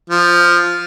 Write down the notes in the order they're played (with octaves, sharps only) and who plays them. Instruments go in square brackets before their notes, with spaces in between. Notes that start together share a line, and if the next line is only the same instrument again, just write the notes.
[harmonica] F3